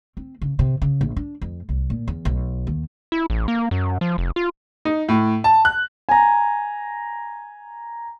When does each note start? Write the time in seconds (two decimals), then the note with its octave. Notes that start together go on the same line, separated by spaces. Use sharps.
0.17 C4
0.42 C#3
0.59 C3
0.82 C#3
1.01 A#1
1.16 D4
1.41 F2
1.69 C2
1.90 A#2
2.08 E2
2.25 B1
2.67 D#2
3.12 E4
3.30 A1
3.48 A#3
3.71 F#2
4.01 F3
4.18 F1
4.36 F4
4.85 D#4
5.09 A2
5.44 A5
5.65 F#6
6.09 G#5 A#5